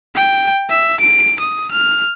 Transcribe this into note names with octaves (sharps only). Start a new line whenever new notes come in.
G5
E5
D7
D#6
F6